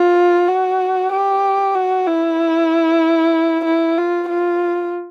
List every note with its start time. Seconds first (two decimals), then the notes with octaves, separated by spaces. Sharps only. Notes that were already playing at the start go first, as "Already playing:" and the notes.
Already playing: F4
0.49 F#4
1.13 G4
1.75 F#4
2.07 E4
3.65 E4
3.98 F4
4.29 F4